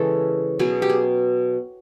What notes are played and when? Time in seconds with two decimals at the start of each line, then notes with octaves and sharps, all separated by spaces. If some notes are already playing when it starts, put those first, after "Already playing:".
Already playing: C#3 E3 G#3 C#4 A4
0.59 B2 F#3 B3 G#4
0.82 G4
0.90 G#4